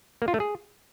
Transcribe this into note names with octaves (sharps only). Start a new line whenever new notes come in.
A#3
F4
A3
G#4